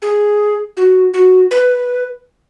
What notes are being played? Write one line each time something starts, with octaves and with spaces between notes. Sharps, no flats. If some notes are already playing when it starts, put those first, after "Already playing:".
G#4
F#4
F#4
B4